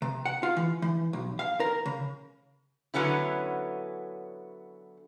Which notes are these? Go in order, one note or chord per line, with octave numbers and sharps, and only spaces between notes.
C3
F#5
F4
E3
E3
B1
F5
A#4
C#3
D3 F#3 B3 C#4 E4